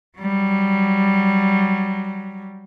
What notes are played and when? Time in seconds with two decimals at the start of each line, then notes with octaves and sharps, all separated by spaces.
0.19 F#3 G3